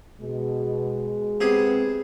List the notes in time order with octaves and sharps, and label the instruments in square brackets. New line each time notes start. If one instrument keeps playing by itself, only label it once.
[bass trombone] B2 [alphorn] G#3
[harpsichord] C3 G#4 [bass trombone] B3